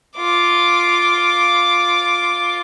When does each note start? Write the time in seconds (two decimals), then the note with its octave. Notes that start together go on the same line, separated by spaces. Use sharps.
0.17 F4 D6